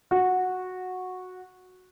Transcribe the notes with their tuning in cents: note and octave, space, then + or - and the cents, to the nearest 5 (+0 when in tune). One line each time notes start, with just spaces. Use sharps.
F#4 -10